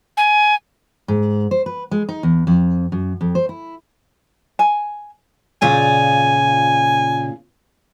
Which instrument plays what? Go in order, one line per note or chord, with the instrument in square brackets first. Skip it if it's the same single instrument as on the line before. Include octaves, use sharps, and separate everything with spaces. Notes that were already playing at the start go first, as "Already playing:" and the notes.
[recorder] G#5
[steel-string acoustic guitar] G#2
C5
B4
G#3
D#4
E2
F2
F#2
F2
C5
E4
[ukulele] G#5
[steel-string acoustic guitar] A#2 C#3 F4 [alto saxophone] G#5